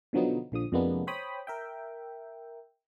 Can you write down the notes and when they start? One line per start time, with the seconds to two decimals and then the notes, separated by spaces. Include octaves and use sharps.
0.13 B2 D3 F3 F#3 B3 D#4
0.52 A#1 D3 F3 D#6
0.72 F2 C3 G#3 A#3 B3 D4
1.07 C5 C#5 G5 B5 D#6
1.47 A#4 E5 G5